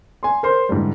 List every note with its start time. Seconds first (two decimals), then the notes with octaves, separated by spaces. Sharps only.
0.23 G#5 C6
0.43 A#4 C5 C6
0.69 G#2 D3 E3 G3